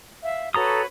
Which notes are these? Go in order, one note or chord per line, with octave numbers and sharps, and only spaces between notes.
E5 F5
F#4 A4 B4 C#5 A#5 D#6